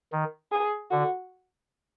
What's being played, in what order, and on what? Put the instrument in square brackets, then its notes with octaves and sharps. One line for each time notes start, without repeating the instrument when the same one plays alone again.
[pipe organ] D#3
[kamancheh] G#4
[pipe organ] D3 [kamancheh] F#4